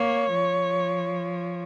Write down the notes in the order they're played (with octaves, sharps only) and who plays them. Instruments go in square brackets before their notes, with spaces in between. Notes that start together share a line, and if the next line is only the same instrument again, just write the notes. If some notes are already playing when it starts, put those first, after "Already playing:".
Already playing: [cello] A#3 [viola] C#5
[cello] F3